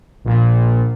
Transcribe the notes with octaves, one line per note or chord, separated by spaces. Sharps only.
A#1 A#2